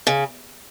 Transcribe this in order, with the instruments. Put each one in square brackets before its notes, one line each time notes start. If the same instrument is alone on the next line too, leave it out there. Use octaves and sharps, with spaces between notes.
[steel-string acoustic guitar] C#3